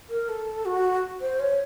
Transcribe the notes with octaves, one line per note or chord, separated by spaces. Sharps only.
A#4
A4
F#4
C5
C#5